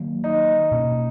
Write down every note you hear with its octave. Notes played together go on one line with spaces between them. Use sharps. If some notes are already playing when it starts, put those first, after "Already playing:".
Already playing: D#3 F#3 A#3
D#4
B2 A#3 C#4